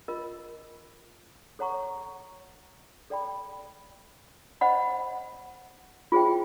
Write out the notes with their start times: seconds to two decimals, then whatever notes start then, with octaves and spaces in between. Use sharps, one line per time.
0.08 F4 A#4 D#5
1.59 A4 C#5 F#5 A#5 C#6
3.10 A4 D5 G5 B5
4.61 C5 D#5 F#5 B5
6.12 F4 G#4 C5 E5 G5